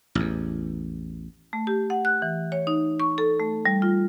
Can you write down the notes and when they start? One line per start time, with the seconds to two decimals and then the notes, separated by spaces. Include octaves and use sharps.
0.15 A1 E2
1.53 A3
1.67 G4
1.90 F#5
2.05 F#6
2.22 E3
2.52 C#5
2.67 D#4
3.00 C#6
3.18 A4
3.40 A3
3.66 G3
3.82 F4